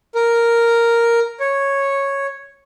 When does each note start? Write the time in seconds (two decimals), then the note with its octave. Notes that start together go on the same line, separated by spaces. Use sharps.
0.15 A#4
1.40 C#5